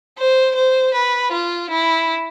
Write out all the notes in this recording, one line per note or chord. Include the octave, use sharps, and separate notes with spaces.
C5
C5
B4
F4
E4